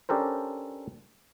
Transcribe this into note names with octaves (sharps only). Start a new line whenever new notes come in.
C#4 D4 G4 A4 A#4 C5